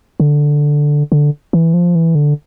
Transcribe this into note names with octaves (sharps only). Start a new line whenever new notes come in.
D3
D3
E3
F3
E3
D3